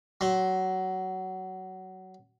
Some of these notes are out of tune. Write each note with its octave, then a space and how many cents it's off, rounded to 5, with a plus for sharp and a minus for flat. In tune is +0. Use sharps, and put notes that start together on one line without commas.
F#3 +20 C6 +35